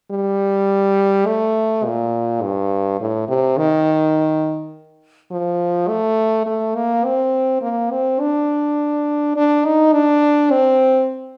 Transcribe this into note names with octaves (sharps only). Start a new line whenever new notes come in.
G3
A3
A#2
G2
A2
C3
D#3
F3
A3
A3
A#3
C4
A#3
C4
D4
D4
D#4
D4
C4